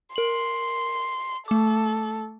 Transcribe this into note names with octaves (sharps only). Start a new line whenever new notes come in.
A#4 C6 F#7
A3 A4 D6